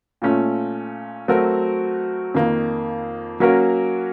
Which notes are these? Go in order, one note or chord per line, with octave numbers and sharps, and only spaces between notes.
A#2 A3 C#4 F4
F#3 A3 C4 F#4 A#4
F2 D#3 A#3
F#3 A#3 C#4 F#4 A#4